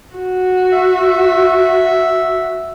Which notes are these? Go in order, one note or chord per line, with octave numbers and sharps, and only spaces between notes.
F#4
E5